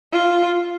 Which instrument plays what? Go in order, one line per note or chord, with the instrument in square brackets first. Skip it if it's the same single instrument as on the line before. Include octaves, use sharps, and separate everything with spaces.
[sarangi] F4